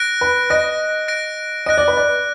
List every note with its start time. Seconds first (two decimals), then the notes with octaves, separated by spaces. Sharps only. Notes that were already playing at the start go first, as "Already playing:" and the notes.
Already playing: F#6 A#6 D7
0.21 B4
0.50 D#5 F#6 A#6 D7
1.08 F#6 A#6 D7
1.66 D#5 F#6 A#6 D7
1.78 D5
1.88 B4
1.97 D5